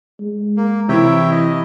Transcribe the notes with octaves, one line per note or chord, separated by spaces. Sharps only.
G#3
A#3
C3 E3 E4 C#5 E5 G5
D#5